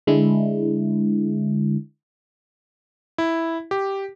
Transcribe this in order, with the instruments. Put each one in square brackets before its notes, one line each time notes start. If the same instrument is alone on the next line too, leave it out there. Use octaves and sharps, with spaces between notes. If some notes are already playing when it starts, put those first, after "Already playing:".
[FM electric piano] D3 G#3 D4 E4
[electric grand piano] E4
G4